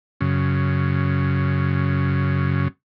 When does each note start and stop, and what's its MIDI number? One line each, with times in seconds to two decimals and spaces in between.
0.21 2.68 42
0.21 2.68 49